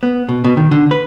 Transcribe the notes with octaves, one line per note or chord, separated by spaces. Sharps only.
B3
B2
B2
D#3
D3
B4